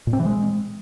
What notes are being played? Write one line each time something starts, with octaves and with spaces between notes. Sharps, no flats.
A#2
C4
E3
G#3